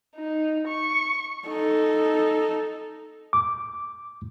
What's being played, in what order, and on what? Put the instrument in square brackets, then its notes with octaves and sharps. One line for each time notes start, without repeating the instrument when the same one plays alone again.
[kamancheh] D#4
C#6
[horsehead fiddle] D#4 A4
[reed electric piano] D6